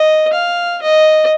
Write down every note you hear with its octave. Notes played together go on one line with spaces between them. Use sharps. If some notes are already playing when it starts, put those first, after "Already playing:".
Already playing: D#5
F5
D#5